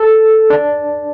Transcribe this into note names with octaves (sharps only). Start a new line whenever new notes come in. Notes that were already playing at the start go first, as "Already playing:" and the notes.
Already playing: A4
D4